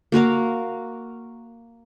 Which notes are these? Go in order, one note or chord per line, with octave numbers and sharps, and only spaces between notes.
A#3 F#4 A#4 F5